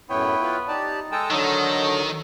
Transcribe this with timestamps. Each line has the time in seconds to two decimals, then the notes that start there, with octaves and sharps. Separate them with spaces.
0.10 F#2 A2 B3 E4 C#5 G5
0.41 F4 B4
0.68 D#4 G4 D5 A5
1.12 G#3 A4 G5 A5 A#5 E6
1.30 D3 D#3 F#3 D#4